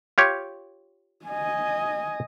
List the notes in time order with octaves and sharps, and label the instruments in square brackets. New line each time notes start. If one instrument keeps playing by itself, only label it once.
[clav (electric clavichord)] F4 G4 C#5
[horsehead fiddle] D#5 G#5